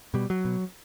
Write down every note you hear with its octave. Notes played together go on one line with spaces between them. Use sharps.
B2 G3
F#3
B2